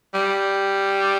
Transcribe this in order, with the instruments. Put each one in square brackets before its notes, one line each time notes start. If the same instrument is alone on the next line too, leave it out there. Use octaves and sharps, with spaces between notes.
[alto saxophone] G3